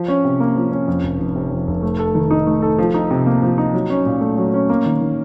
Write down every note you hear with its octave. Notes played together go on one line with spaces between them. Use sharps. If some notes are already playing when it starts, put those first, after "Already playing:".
Already playing: F3
C#4
C3
A#3
F3
C#4
F2
F1
F1
C3
F2
F1
A3
A4
D#3
D#4
A3
A4
F3
D#4
C3
A#3
F3
D#4
F#3
C#4
A#2
A3
F#3
C#4
A#3
D#3
D#3